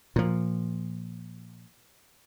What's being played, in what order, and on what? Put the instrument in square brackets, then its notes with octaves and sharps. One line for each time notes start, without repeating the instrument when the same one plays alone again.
[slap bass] A#2 F3